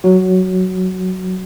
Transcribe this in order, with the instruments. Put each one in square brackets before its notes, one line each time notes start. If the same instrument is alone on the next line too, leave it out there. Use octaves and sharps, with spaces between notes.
[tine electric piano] F#3 F#4